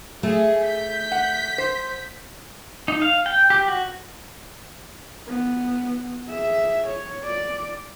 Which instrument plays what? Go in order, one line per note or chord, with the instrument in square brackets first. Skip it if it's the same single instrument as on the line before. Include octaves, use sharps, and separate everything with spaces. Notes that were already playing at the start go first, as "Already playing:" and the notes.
[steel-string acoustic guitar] A3 [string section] G#4
[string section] G6 B6
[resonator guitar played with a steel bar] F#5
C5
[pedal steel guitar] D#4
F5
G5
G4
F#4
[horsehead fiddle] B3
G#4 E5
C#5
D5